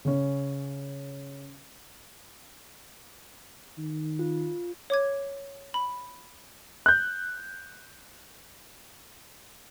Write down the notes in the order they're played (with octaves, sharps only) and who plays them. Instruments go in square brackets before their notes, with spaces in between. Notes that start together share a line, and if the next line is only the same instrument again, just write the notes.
[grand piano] C#3 C#4
[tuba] D#3
[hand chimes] F4
[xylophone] C#5 D6 G#6
B5
[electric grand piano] F#6 G6